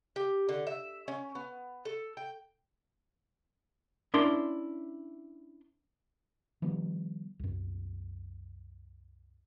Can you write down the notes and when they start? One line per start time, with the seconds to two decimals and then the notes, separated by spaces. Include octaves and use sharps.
0.16 G4
0.49 D3
0.67 E5
1.08 C#4
1.35 B3
1.85 A4
2.17 G5
4.14 C#4 D4 E4 A#4 C6
6.62 D#3 F3 G3 B3
7.39 C2 F#2